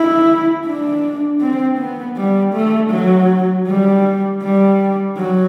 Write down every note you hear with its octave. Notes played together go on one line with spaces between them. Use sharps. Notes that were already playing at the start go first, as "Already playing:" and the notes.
Already playing: E4
D4
C4
B3
G3
A3
F#3
G3
G3
F#3